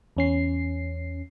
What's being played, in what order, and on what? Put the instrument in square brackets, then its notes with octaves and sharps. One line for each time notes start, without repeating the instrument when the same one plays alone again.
[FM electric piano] E2 C#4 C7